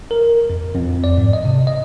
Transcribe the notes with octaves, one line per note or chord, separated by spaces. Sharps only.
A#4
F2
F2
D5
G#2
D#5
C3
D#5